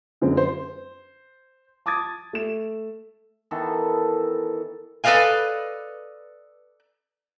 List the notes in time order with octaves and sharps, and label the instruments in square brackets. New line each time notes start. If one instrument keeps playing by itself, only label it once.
[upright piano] F#2 D3 G#3 C4
C5
A5 D6 D#6 G#6 A6
A3 E7
[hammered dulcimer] D#3 E3 B3 A4
[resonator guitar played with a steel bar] A4 B4 D5 D#5 F5 G#5